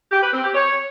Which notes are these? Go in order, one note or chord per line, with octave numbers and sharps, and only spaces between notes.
G4
B4
C4
G4
C#5